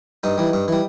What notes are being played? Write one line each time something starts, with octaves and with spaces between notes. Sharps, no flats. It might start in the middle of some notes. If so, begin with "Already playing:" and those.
G2 D#4
E3 G3
G2
E3 G3